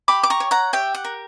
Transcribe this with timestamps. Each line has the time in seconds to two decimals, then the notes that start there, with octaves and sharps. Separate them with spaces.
0.08 G4 B5 D6
0.23 D6
0.30 A#5 C#6
0.40 C#5
0.51 F#5 A#5
0.73 G4 E5 G5
0.94 F#5
1.05 A#4